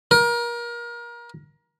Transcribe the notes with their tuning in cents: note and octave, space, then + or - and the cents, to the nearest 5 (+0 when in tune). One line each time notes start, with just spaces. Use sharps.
A#4 +30